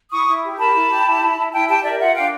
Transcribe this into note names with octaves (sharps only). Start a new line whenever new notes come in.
E4 C#6 D#6
E4
G4
A#4 A5 B5
E4
G4
E4
E4
E4
E4 G5 A5
G4 G5 A5
A#4 D5 E5
F4 E5 F#5
D4 F5 G5